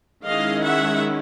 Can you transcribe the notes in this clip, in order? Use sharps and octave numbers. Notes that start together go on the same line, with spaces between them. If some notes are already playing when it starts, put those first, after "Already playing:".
D#3 G#3 C#4 E4 D#5 F5
E5 F#5